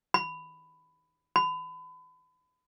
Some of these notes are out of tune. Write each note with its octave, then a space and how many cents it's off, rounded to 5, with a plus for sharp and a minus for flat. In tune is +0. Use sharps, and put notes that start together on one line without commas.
B5 +15
B5 +35